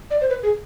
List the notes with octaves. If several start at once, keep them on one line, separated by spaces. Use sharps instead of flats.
D5
C5
B4
G#4